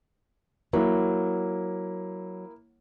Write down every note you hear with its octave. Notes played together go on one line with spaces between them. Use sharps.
F#3 A#3 E4